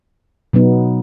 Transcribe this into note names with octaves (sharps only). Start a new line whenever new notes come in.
B2 F#3 B3 D#4